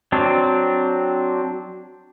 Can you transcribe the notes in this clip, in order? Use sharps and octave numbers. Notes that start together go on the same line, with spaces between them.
F#3 C4 D4